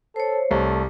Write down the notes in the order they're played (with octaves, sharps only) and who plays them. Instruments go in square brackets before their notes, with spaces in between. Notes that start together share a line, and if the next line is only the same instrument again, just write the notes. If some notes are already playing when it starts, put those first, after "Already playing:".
[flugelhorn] A4 [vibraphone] C5 C#5
[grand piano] C2 [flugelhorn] A3